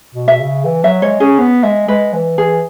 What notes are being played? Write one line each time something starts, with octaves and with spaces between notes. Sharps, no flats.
B2
E5
C#3
E3
F#3 E5
G#3 C#5
C#4 G#4
B3
G#3 E5
G#3 B4
E3
E3 G#4